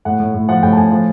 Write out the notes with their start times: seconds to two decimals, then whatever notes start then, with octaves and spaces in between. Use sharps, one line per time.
0.05 A2 F#5
0.20 A2
0.34 A2
0.49 F3 F#5
0.63 A2 G5
0.73 A5
0.77 A2 G#5
0.91 F3